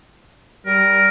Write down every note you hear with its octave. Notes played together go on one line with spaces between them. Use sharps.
G3 A#4